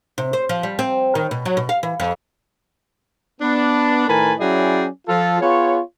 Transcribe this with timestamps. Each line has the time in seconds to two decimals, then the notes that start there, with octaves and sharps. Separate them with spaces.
0.18 C3
0.33 C5
0.49 F3
0.63 G3
0.79 C4
1.15 D#3
1.31 B2
1.45 F#3
1.57 B2
1.69 F5
1.83 E3
2.00 F2
3.41 B3 D4
4.08 A2 D#3 A#4 B4 G#5 A5
4.39 F#3 C#4 E4 G#4 D5 G5
5.07 F3 F4 A4
5.41 B3 F4 G#4 C#5